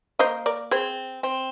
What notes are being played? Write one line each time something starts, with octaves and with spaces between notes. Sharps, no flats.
A#3 C5 D#5
A#4 D5
C4 G#4 C5
C4